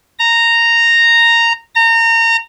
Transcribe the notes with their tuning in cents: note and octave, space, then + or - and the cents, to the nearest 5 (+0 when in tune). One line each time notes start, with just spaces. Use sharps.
A#5 -10
A#5 -30